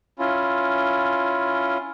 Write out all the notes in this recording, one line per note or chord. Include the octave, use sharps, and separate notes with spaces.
C#4 E4 F4